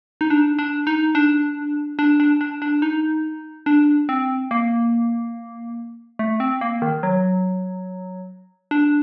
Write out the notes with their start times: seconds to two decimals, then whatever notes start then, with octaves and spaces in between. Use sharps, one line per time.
0.21 D#4
0.30 D4
0.59 D4
0.87 D#4
1.15 D4
1.99 D4
2.20 D4
2.41 D4
2.62 D4
2.82 D#4
3.66 D4
4.09 C4
4.51 A#3
6.19 A3
6.40 C4
6.61 A#3
6.82 D#3
7.03 F#3
8.71 D4